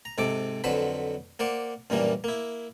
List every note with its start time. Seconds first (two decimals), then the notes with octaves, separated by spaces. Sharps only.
0.05 A#5
0.18 G#2 C3 A4 D6
0.64 F2 D3 F#3 B4 C5 B5
1.39 A#3 C5 D5 F#5
1.90 F#2 A#2 E3 G3 A#3 D4
2.24 A#3 E4